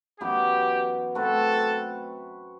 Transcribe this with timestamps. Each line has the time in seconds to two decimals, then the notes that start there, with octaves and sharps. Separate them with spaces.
0.20 F#2 E3 B3 E4 G4
1.15 A3 C4 F#4 A4 B4